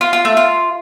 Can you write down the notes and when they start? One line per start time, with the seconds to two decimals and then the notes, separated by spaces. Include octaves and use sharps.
0.01 F4
0.13 F4
0.25 A3
0.37 F4